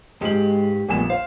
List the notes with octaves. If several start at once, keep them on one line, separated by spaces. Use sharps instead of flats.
G#2 G#3 G4 F#7
A#1 G3 A3 B3 G#5 E7
C5 F5